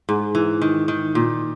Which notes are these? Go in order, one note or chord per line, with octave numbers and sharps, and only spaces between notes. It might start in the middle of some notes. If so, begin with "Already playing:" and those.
G#2
E3
D#3
D#3
A#2